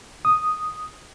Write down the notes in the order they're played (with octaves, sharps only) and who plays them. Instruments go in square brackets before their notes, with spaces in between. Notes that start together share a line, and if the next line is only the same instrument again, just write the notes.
[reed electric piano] D#6